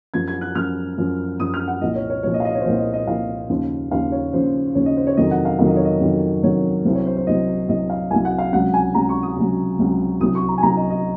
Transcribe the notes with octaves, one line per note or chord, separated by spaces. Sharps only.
F#2 F3 G#6
G#6
F#6
F#2 F3 F6
F#2 F3
F#2 F3 D#6
F6
F#5
C2 A#2 F3 D#5
C#5
C#5
C2 A#2 F3 C#5
D#5
F5
D#5
C#5
C5
C2 A#2 F3 C#5
D#5
D#5
C2 A#2 F3 F5
D#2 C#3 F3
D#2 C#3 F3 F5
C#5
D#2 C#3 F3 C5
D#2 C#3 F3 C#5
D#5
C5
C#5
F2 C3 D#3 F#3 D#5
F#5
F5
F2 C3 D#3 F#3 F5
D#5
C#5
D#5
F2 C3 D#3 F#3
F2 C3 D#3 F#3 C#5
C2 C3 F#3 C5
C#5
C5
C5
C2 C3 F#3 D#5
C2 C3 F#3 D#5
F5
C2 C3 F#3 G#5
F#5
F5
C#2 C3 F#3 F#5
G#5
C#2 C3 F#3 A#5
C#6
D#6
C#2 C3 F#3
C#2 C3 F#3
C2 C3 F#3 D#6
C#6
A#5
G#5
C2 C3 F#3 A#5
D#5
D#5